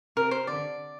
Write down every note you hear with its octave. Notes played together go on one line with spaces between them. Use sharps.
C3 A#4
C5
D3 D5